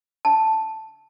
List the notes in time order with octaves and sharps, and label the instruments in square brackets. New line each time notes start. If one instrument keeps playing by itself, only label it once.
[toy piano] A5